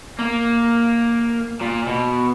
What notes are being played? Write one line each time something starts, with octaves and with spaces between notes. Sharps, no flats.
A#3
A#2
B2